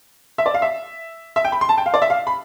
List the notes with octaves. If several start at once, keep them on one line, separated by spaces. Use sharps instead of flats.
E5
D5
F5
E5
E5
G5
B5
C6
A5
G5
F5
D5
E5
F5
B5